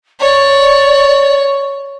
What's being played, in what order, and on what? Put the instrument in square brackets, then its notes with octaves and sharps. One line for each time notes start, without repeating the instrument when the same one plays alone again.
[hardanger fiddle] C#5 [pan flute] D5